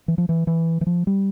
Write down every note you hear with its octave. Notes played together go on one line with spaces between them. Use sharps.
E3
F3
E3
E3
E3
F3
G3